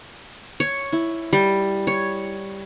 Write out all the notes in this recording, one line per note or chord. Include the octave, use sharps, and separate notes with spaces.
C#5
E4
G3
C#5